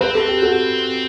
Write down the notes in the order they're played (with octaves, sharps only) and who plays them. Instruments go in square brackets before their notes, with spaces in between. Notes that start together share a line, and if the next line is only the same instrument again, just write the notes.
[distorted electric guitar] C4 [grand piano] B4
[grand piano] A4
G4
F#4 A4